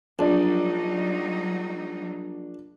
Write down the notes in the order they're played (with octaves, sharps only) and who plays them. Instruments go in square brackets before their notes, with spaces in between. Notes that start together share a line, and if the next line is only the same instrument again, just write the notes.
[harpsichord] A#1 [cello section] F#3 G3 D#4 [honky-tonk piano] D4 D5